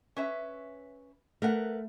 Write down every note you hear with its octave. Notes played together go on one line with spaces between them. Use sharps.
C#4 B4 E5
A3 A#4 B4 F#5